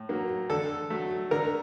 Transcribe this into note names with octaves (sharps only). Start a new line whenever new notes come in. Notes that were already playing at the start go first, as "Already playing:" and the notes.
Already playing: A2
F#3 A#3
D3 A4
F#3 A3
D3 A#4